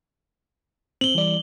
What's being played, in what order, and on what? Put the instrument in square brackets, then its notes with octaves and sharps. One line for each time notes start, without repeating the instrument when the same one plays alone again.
[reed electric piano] C4 [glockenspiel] F#7 G7
[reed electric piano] E3 G3 D5